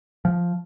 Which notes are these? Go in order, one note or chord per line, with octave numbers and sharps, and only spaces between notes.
F3